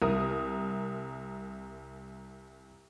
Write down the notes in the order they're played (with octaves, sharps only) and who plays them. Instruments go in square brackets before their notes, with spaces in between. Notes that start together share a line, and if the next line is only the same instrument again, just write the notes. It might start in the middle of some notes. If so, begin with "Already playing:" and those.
[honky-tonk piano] C2 A#4 D#6